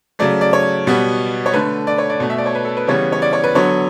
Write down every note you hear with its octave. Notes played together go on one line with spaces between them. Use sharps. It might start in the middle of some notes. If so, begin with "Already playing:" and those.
C#3 F#3 A3 D5
D5
C#5
B2 G3 B3
C#5
D3 A3 B4
D5
C#5
D5
B2 A3
E5
D5
C#5
B4
A4
B4
C#3 E3 G3 B3 C#5
C#5
D5
C#5
B4
D3 F#3 B3 C#5